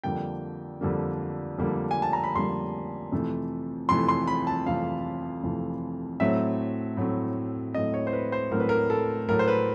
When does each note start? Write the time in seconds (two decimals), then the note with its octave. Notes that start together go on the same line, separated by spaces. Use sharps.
0.04 F2 D3 G3 A#3 G5
0.81 F2 D3 G3 A#3
1.58 F2 D3 G3 A#3
1.91 G#5
2.02 A5
2.13 A#5
2.24 B5
2.35 F2 D3 G3 A#3 C6
3.12 F2 C3 E3 A3
3.89 F2 C3 E3 A3 C6
4.08 C6
4.27 B5
4.47 A5
4.66 F2 C3 E3 A3 F5
5.43 F2 C3 E3 A3
6.20 A2 F#3 A3 C4 E5
6.97 A2 F#3 A3 C4
7.74 A2 F#3 A3 C4 D#5
7.94 C#5
8.07 C5
8.13 B4
8.32 C5
8.51 A2 F#3 A3 C4 A#4
8.60 B4
8.69 A#4
8.90 A4
9.29 A2 F#3 A3 A#4
9.39 C5
9.48 B4